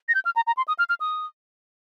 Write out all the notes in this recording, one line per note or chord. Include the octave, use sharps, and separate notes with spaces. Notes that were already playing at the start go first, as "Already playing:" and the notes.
A#6
G6
F6
A#5
A#5
C6
D#6
F6
F6
D#6